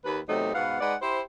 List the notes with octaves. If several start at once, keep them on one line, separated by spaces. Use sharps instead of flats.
D#2 B4
E2 C3 F#3 A3 D#4
G#2 B2 B3 F5 F#5
G#3 D#4 B4 D5 F#5
E4 G4 C5